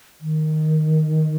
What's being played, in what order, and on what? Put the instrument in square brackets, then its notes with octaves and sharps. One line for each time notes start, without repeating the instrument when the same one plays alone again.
[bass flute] D#3